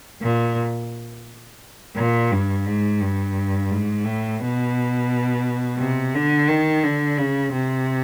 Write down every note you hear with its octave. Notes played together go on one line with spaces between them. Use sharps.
A#2
A#2
G2
G#2
G2
G#2
A2
B2
C3
D3
D#3
D3
C#3
C3